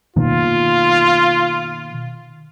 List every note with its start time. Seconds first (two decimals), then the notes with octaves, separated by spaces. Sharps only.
0.16 B2 D#3 A#3 F4